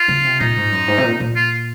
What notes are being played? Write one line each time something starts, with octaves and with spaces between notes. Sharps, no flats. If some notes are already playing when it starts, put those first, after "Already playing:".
Already playing: F4
C#3
C3
A#2 D#4
G#2
F#2
G#2
C3
A#2
A#2
F4